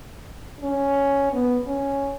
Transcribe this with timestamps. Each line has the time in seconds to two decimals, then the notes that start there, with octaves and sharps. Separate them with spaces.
0.61 C#4
1.33 B3
1.68 C#4